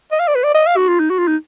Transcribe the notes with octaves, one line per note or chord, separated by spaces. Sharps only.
D#5
F5
D5
B4
D5
D#5
F5
F#4
F4
D#4
F#4
F4
D#4